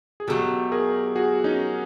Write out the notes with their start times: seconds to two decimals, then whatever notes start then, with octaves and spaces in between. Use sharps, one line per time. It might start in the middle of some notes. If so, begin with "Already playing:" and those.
0.20 G#4
0.28 B2 F#3 A3 G4 A4
0.72 G#4 A#4
1.16 F#4 G#4
1.44 C#4 D#4